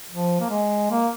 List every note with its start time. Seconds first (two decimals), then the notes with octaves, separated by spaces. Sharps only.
0.10 F3
0.40 A#3
0.50 G#3
0.90 A#3